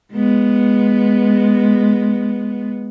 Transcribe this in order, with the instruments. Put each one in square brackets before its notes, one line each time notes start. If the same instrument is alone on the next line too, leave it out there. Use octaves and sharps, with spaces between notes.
[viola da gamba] G#3 B3